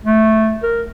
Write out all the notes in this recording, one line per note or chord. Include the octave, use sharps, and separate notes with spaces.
A3
A#4